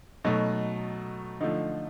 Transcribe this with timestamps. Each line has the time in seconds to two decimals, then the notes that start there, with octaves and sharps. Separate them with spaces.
0.24 B2 F#3 A3 D#4
1.41 D3 F3 A3 D#4